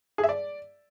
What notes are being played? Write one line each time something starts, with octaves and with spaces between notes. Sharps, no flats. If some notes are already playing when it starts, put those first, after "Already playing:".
G#4
E5
D5